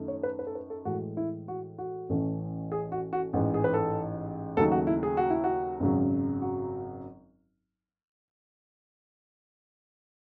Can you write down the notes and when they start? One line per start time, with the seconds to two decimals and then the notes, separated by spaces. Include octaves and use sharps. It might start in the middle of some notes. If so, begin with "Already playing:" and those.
Already playing: F#2 D#3 A3
0.08 C#5
0.23 B4
0.39 B4
0.47 A4
0.55 B4
0.70 A4
0.85 A2 E3 G#3 F#4
1.17 E4
1.48 F#4
1.78 F#4
2.09 A1 A2 E3 A3 C#4
2.72 G#4
2.92 F#4
3.13 F#4
3.33 A1 G#2 E3
3.54 G#4
3.64 B4
3.74 A4
4.57 D#2 C#3 F#3 A3 D#4 A4
4.72 F#4
4.87 E4
5.03 G#4
5.17 F#4
5.30 E4
5.44 F#4
5.80 G#1 F#2 C#3 F#3
6.42 F#4